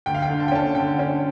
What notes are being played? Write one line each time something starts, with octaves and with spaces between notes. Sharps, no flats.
D2 G5
F5
G5
D3
A5
G5
C#4 A5
D3 G5
C#4